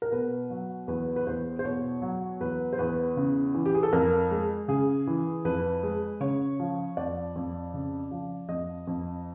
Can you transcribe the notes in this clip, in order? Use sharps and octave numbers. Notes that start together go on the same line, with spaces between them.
A#4
B2 B4
F#3
E2 B4
B4
E2 C5
C5
B2 C#5
F#3
E2 B4
C5
E2 B4
C#3
E3
G4
G#4
A4
F2 A#4
G#3
C#3 G#4
E3
F2 B4
G#3
C#3 C#5
F3
F2 D5
F2
C#3
F3
F2 D#5
F2